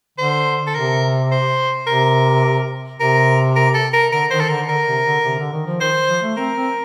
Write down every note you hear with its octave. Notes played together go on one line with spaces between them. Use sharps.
D3 C5
A4
C3 A#4
C5
C3 A#4
C3 A#4
A#4
A4
A#4
D3 A#4
D#3 C5
A4
D3 A#4
D3 A#4
C3
D3
C3
D3
D#3
F3
D#3 C5
F3
A3
C4 A#4
C4